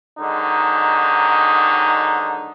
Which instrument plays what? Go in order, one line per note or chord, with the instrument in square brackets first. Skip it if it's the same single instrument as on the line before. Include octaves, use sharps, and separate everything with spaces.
[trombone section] G#2 D3 D#3 F#3 D#4